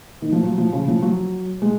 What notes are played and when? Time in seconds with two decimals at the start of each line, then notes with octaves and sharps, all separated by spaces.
0.22 D#3
0.32 F3
0.43 F#3
0.58 F3
0.73 C#3
0.88 F3
1.03 F#3
1.62 G#3